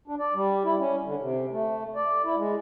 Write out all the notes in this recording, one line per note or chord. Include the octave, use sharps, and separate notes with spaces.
D4
D5
G3
E4
C#4
D3
C3
A3
D5
E4
G#3